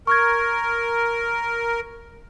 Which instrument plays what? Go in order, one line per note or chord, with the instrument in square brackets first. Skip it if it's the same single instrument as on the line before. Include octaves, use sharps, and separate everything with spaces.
[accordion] A#4 [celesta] C#6 F6 G#6